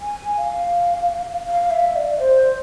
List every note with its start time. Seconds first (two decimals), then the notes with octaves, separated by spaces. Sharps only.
0.01 G#5
0.37 F5
1.47 F5
1.71 E5
1.96 D5
2.19 C5